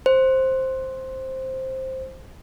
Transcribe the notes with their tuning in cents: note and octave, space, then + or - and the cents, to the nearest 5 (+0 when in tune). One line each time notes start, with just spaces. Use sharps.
C5 +5